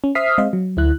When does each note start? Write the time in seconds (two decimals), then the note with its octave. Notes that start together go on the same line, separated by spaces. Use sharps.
0.04 C#4
0.15 C5 E5 D#6 F6 B6 C7
0.38 G#3 C4 C5 D#5 F5
0.53 F#3
0.77 D2 E4 F#6